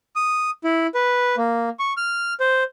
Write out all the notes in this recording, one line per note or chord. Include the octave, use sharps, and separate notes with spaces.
D#6
E4
B4
A#3
C#6
F6
C5